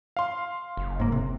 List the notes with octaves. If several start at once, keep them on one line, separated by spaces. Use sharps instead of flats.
F5 C6
F#1
G#2 A#3
C3